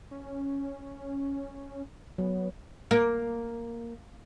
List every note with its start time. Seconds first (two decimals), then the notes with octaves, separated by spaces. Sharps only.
0.11 C#4
2.18 F#3 B3
2.91 A#3